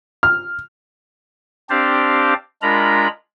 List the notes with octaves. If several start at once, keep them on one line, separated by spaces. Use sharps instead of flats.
F6
C4 D4 G4 C5 D5 F5
G#3 D4 F4 A#4 A#5 B5